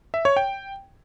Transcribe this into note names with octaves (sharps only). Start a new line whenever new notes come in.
E5
C#5
G5